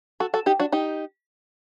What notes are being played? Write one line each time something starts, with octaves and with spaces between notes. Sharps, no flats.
F#4 A4
F#4 A4
D#4 G4
D4 F#4
D#4 G4